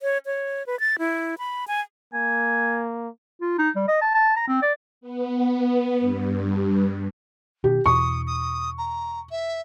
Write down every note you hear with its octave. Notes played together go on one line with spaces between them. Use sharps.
C#5
C#5
B4
A6
E4
B5
G#5
A#3 G#5
F4
D#4
G3
D#5
A5
A5
A#5
C4
D5
B3
G2
B2 D#3 G4
E2 B2 E3 C#6 D#6
D#6
A#5
E5